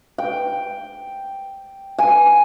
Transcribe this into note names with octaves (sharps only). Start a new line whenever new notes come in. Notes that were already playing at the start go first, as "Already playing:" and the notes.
G5
G#5